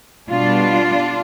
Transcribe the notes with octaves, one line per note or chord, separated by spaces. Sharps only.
B2 G3 B3 D4 F4